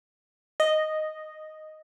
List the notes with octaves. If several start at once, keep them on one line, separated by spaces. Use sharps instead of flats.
D#5